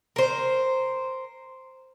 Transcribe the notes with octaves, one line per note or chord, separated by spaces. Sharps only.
A#4 C5